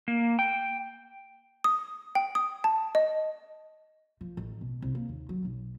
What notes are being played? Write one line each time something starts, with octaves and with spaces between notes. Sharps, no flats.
A#3
G5
D#6
G5
D#6
A5
D#5
F3
A1
B2
C2
A#3
D#2
F#3
B1